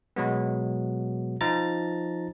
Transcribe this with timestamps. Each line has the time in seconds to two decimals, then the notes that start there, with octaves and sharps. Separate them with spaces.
0.16 B2 F#3 G#3 B3
1.41 F3 D#4 A#5 A6